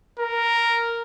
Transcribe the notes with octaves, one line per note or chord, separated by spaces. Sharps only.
A#4